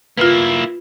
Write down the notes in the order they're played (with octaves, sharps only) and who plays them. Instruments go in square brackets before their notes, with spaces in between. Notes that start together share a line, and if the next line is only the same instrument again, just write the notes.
[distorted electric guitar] A#3 E4 [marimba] F4 B4